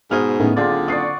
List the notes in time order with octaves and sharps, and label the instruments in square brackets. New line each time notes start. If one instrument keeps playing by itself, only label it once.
[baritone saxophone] G#2 [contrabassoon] B2 [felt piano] C5 D#6 F6
[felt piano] A2 B3 C#4 [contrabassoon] D#3
[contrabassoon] F#1 [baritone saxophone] D3 [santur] C4 F4 D5 [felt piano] G#4
[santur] D5 F#5 C#6 [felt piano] D#6 C7